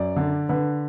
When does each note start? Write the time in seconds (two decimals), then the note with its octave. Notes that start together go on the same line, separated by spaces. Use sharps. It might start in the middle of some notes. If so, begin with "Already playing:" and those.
Already playing: F#2 D5
0.16 D3
0.49 D3 B4